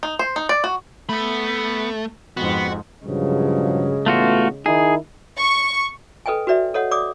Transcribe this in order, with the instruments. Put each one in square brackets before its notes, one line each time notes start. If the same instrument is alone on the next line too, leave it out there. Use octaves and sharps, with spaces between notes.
[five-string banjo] D#4
C5
D#4
D5
F#4
[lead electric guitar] A3 [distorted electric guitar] B3 B5
[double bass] F2 G#2 [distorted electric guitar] B3 [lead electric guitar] F#4
[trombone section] G2 F3 F#3 [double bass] C#3 G#3
[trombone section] A1 B3 [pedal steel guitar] A3 F4 F#4
[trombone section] D#3 D#4 E4 [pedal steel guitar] G#4
[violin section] C#6
[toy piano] A4 B4 D#5 G5 G#5
F#4 B4 D5 E5
A4 C#5 D#5 F#5
D5 D6 D#6